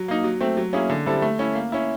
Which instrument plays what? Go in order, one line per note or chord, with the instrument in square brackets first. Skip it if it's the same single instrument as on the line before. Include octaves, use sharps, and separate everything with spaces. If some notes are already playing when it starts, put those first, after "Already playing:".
Already playing: [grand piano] F#3
A#3 D#4
F#3
A3 C4
F#3
A#3 C#4 E4 G#4
D3
G3 C4 E4 A4
A3
C#4 E4
A#3
C#4 E4